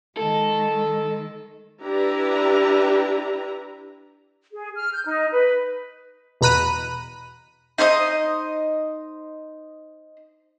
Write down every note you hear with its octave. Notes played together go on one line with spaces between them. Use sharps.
D#3 G#3 A4
D4 E4 G4 B4 A#5
G#4
F6
G6
D#4
B4
E2 B2 A#5 B5 F#6 D#7
D#4 C5 C#5 D#5